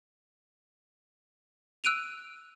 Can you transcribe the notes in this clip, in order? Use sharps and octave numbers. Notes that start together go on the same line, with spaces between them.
E6 F#6 D7 D#7 F7